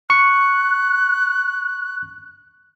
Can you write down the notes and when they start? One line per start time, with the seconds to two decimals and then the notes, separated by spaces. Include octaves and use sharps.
0.10 C#6 F#6 C#7